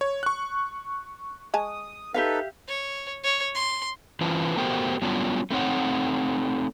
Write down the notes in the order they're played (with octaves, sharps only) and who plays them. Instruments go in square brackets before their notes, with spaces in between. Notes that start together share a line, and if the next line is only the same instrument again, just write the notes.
[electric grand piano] C#5
C#6 F#6
[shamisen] G#3 G#5 A5 [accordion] D#6
[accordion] D#4 A4 B4 [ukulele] G4 E5 F5
[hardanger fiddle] C#5
C#5
C6
[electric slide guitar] E3 C#4 F4 B4 C5 A5
A3 B3 F#4 G4 A#4 C5
F#3 G3 B3 C#4 D4 F4
A3 C4 D#4 C#5 F#5